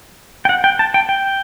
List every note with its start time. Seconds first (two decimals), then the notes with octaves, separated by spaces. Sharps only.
0.45 G5
0.49 F#5
0.64 G5
0.79 A5
0.94 G5
1.09 G5